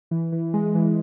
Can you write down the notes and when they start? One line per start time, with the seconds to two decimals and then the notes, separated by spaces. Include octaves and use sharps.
0.11 E3
0.32 E3
0.54 G#3
0.75 E3